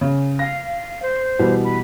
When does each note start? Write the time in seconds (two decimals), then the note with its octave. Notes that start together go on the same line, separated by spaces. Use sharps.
0.01 C#3
0.39 F5 A#6
1.02 C5
1.39 B2 E3 G3
1.64 B5